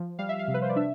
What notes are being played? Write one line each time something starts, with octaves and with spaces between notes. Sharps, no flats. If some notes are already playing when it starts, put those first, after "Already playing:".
Already playing: F3
G3 F5
E5
F5
C3
B4
C5
D5
D4 E5